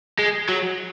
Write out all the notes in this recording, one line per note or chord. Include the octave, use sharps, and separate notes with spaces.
G#3
F#3